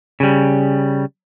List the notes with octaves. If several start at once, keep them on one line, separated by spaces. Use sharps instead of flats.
C#3 G3